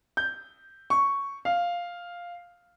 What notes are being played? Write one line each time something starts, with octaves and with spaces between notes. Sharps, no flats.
G6
C#6
F5